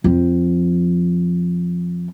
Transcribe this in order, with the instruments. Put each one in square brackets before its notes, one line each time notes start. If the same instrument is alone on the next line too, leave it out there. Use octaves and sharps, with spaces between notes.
[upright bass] F2 F3